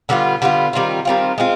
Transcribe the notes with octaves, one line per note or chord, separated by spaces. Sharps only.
D3 G3 B3 F4
D3 G3 B3 F4
D#3 G3 C4 F4
D#3 G3 C4 F4
G#3 C4 F4